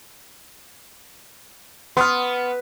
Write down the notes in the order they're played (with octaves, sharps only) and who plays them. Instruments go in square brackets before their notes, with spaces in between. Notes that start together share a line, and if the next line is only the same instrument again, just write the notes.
[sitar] B3 [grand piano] C6 D#6 F6